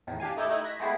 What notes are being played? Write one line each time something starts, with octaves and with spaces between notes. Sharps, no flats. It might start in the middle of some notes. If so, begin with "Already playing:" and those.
E2 A2 D#3
D4 G4 F5 G#5
A3 D#4 E4 G4 A4
A3 D#4 E4
F#6 G#6 A#6 B6
G#3 A3 B3 E4 G4 G#4